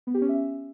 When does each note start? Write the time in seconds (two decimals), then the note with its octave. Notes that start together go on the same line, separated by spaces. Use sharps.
0.07 B3
0.14 G4
0.22 C#4
0.29 E5